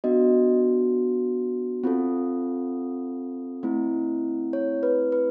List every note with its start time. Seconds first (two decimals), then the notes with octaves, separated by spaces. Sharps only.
0.04 B3 D4 F#4 D#5
1.84 C4 F4 A4
3.63 A3 C4 E4
4.53 C#5
4.83 B4
5.12 B4